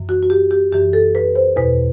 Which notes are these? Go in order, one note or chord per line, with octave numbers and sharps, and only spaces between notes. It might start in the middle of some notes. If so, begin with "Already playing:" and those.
Already playing: F#2 E3
F#4
F#4
G4
G4
F#2 E3 G4
A4
B4
C5
E2 B2 B4